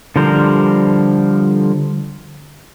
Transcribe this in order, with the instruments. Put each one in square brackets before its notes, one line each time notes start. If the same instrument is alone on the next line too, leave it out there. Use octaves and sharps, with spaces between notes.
[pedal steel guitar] D3 F3 G3 A#4 C5